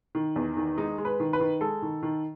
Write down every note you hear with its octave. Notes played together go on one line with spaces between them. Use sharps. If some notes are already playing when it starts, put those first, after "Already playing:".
D#3
E2
D#3
G#3 D#4
G#3
B4
D#3
B4
D#3
G#3 A4
D#3
D#3